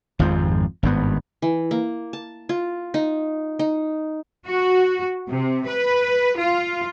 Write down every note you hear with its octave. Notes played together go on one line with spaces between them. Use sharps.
G#1 F2 G#2 F3
G#1 G2 B3
E3
A#3
A5
F4
D#4
D#4
F#4
C3
B4
F4